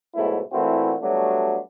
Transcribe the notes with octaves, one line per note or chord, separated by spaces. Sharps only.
C#2 G#2 B2 F#3 A3 E4
A#2 E3 A3 C4 E4 F#4
F#3 G3 A3 B3 D4 F#4